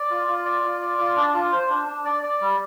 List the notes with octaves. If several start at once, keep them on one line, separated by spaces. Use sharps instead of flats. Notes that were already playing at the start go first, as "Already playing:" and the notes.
Already playing: D5
F4
F4
D5
F4
D5
F4
D4
F4
C5
D4
D4
D5
D5
G3